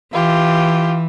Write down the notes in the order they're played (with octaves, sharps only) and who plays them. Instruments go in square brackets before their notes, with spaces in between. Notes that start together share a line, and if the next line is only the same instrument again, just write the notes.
[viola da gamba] E3 [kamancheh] F4 G4